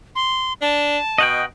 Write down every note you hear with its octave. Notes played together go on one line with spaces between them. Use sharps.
C6
D4 A5
B2 D#5 F#5 G5